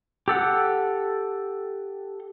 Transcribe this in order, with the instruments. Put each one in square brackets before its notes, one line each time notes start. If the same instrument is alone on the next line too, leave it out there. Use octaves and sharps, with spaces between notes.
[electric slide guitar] G4 A4 F#5